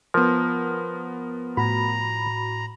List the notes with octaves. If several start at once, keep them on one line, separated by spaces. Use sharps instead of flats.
F3 B3 A#4
A2 F#4 A#5 B5